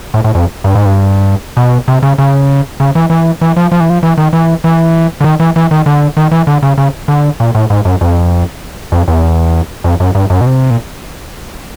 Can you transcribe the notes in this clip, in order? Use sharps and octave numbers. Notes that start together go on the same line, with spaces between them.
A2
A2
F2
G2
G#2
G2
B2
C3
C#3
C#3
C#3
E3
E3
E3
F3
F3
E3
F3
E3
D#3
E3
E3
D3
D#3
E3
E3
D#3
D3
D#3
E3
D3
C#3
C#3
D3
A#2
A2
G#2
F#2
F2
F2
E2
F2
F#2
G2
F#2
B2
C3
A#2